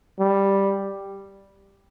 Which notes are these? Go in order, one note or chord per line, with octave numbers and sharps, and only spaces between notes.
G3